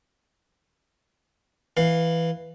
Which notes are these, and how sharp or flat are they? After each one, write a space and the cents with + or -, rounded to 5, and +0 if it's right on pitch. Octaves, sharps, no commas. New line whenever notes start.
E3 +0 F5 +0